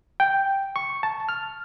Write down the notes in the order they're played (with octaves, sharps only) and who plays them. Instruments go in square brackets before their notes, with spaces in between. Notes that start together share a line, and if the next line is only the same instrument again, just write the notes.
[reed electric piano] G5
C#6
A5
F6